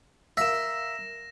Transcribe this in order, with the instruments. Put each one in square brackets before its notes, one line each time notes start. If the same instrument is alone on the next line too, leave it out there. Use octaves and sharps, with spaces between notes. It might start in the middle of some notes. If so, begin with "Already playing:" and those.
[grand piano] A#4 F5 [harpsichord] E5 [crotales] A#6 E7